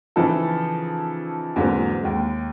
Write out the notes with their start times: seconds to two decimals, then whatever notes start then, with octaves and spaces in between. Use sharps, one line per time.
0.16 C#3 E3 F3 D#4 A4
1.56 E2 G#2 D3 F#3 A#3 C4
2.01 D#2 G#3